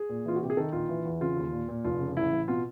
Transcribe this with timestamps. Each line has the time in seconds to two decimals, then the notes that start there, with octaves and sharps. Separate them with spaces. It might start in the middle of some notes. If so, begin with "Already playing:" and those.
Already playing: G#4
0.09 A#2
0.25 E3 F4
0.35 F#4
0.41 C3 G4
0.50 G#4
0.57 D#3 A4
0.72 A#1 F4
0.89 E3
1.05 E2
1.21 C#3 F4
1.36 D#2
1.52 A#2
1.69 A#2
1.84 F1 F4
2.00 C#3
2.16 A1 E4
2.32 A1
2.48 B2 F4